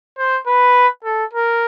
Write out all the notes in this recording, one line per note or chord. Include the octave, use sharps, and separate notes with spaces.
C5
B4
A4
A#4